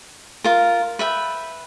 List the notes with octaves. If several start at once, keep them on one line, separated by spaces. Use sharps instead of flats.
F4 A#4
B4 E5 G5